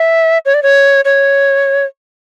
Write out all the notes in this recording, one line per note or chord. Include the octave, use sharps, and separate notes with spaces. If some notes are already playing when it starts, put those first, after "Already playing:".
Already playing: E5
C#5
D5
C#5
C#5